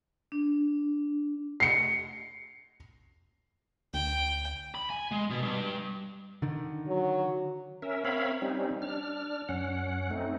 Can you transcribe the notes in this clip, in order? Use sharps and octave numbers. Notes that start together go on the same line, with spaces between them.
D4
C7 C#7
D2 G5
B5
G#5
G#3
B2
G2
D3 D#3
F#3
C#4 A#4 E5
C4 A#4 C#5 E5 F5 B5
G3 C4 C#4 D#4
D4 F6
F#2 C#4 F#5
A3 C4 D#4